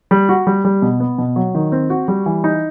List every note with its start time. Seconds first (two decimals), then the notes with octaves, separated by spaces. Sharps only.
0.11 G3
0.29 F#4
0.47 G3
0.65 G3
0.82 B2
1.00 B3
1.18 B2
1.36 F#3
1.55 D#3
1.72 C4
1.90 F#4
2.08 G3
2.26 E3
2.44 D#4